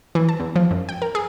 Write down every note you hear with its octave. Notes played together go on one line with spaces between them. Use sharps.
E3
A5
E2
F3
F#2
G5
A#4
G#4